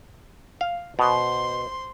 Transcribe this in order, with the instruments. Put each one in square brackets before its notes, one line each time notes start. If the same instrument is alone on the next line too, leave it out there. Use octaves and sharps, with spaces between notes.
[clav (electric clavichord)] F5
[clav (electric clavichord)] B2 [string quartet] C5 C6